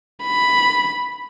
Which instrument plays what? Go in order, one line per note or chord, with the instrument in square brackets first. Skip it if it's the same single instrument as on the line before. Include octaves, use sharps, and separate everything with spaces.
[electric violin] B5